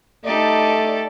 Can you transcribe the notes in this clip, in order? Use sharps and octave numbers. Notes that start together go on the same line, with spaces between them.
A3 D#4 G4 A4 D5